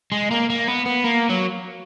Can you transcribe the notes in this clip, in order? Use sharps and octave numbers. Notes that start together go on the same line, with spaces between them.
G#3
A#3
A#3
B3
B3
A#3
F#3